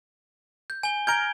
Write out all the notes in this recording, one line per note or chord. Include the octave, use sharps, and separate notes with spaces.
G6
G#5 G7
A#5 F6 G6 G#6 D7 G7